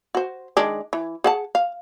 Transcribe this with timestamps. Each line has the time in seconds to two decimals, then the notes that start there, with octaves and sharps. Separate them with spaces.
0.15 F#4 C5
0.57 D#3 G#3 D4
0.93 E3
1.24 G#4 F#5 A5
1.55 F5